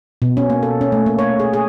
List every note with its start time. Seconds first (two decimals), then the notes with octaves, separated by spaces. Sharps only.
0.22 B2
0.37 C#4
0.50 A#3
0.63 A4
0.81 C#4
0.92 A3
1.06 A#3
1.19 C#5
1.40 G#4
1.53 G#4